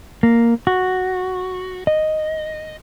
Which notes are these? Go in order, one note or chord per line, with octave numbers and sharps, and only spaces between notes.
A#3
F#4
D#5